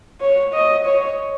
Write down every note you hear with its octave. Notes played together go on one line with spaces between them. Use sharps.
C#5
D#5
C#5